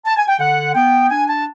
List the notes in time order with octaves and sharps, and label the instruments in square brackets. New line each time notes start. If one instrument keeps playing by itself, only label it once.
[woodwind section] A5
G#5
G5
D3 F#5
B3 G5
D4 G#5
A5